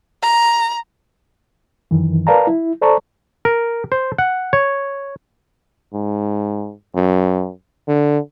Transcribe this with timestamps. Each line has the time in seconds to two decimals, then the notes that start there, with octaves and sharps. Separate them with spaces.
0.22 A#5
1.91 F#2 D#3 E3
2.27 A#4 B4 D5 F5 A5 A#5
2.47 E4
2.82 A4 C5 D5 A5 A#5 C#6
3.45 A#4
3.92 C5
4.19 F#5
4.53 C#5
5.94 G#2
6.95 F#2
7.88 D3